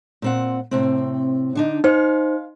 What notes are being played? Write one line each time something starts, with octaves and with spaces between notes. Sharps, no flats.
A#2 C4 F#5
A2 C3 C4
D3 D4 D#4
D#4 C5 F5